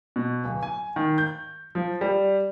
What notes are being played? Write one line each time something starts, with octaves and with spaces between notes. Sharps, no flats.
B2
D1
G#5
D#3
G6
F3
G3